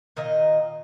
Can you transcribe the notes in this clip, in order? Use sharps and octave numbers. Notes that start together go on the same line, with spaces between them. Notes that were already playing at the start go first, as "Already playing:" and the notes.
A#2 D#3 A#4 D#5